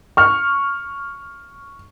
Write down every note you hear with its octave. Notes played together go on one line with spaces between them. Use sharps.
C#6 F6